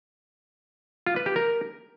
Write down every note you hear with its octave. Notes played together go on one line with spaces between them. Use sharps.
F4
B4
G4
A#4